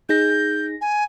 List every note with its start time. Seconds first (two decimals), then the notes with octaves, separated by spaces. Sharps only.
0.09 D#4 G#4 G6 A#6
0.81 G#5